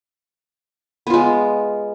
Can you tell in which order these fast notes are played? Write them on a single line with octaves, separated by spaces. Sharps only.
B3 F4 G#3